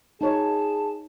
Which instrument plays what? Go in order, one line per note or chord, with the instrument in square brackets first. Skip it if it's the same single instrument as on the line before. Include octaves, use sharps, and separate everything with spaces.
[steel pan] D#4 C#5 [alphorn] G#4 [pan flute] A5